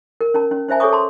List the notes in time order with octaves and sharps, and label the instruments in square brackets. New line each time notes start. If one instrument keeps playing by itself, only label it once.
[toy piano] A#4
C#4 A#4 A5
C#4
C#4 C5 E5 G#5 A5
G#4 A4 C#5 G#5 C#6 D#6
A5 C6